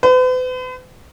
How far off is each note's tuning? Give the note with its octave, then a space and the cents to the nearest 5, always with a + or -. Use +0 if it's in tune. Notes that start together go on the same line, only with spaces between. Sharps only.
B4 +45